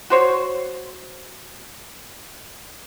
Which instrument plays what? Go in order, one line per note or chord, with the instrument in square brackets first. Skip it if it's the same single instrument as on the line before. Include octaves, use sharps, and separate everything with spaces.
[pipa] F#4 C5 C#5